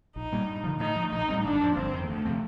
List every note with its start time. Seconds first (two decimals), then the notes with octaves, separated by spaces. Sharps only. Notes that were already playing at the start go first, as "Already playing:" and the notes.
0.16 A#1 D#4
0.32 A#2 G3 A#3
0.48 G2
0.64 D3 F3
0.80 A2 D#4
0.96 F3 A3
1.12 A#1 D#4
1.29 A2 G3 C4
1.44 G1 D4
1.60 F2 C3 F3
1.76 G1 C4
1.93 F2 D#3
2.08 D2 A3
2.25 C3 F3 C4